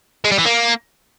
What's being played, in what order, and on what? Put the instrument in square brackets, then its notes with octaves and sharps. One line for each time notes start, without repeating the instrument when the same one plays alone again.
[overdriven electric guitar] G#3
G3
E3
A#3